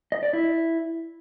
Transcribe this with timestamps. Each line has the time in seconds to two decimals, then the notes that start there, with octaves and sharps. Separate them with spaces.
0.12 D#5
0.23 D5
0.33 E4